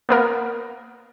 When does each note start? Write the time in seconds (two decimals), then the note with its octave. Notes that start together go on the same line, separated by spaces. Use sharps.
0.09 A#3 B3 A#4